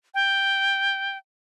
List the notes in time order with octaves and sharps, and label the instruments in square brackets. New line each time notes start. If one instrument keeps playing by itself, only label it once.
[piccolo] G5